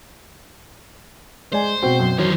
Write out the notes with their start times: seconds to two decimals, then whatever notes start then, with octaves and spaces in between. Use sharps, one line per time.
1.53 G#3 C5 D5 G#5
1.83 B2 C4 F#4
2.00 F#2
2.18 D#3 E3 F#3 C5